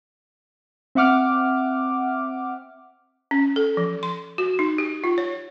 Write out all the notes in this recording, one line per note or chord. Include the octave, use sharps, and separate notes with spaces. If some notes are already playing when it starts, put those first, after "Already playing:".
C4 E5 F#5 D6 F6
C#4
A4
F3
C6
F#4
D#4
G4
F4
C#5